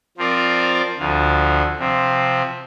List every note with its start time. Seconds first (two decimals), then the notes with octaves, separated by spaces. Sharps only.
0.17 F3 C4 F4 A#4 D5
0.98 D2 D3 F3
1.79 C3 F3 C4